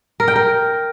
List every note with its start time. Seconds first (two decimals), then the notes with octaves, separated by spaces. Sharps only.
0.20 A#4
0.28 G5
0.36 A#4